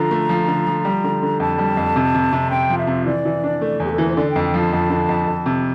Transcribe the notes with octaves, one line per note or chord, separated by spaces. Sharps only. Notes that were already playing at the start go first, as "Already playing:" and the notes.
Already playing: D3 F3 F4 A#5
A3
F3
D3
F3
G3
D3
D3
F2 A5
G3
F2
C3
C3
C3
C4 G5
F3
E5
C3
E3 D5
E3
D4
A3
E2 G4
A4
E3 A#4
C5
D3 D5
G5
F2
G5
F3 A5
F2
D3
F2
F2
C3